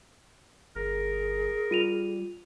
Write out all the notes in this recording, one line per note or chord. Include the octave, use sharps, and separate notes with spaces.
G1 G#4 A#4
G3 F4 D#7 F7